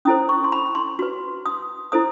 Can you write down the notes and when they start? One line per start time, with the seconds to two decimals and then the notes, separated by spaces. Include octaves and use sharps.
0.05 C#4 E4 A4 C5 D#6
0.29 C#6
0.44 C6
0.52 B5
0.75 C6
0.99 F#4 B4 C6
1.46 D#6
1.92 E4 A4 C5 D#6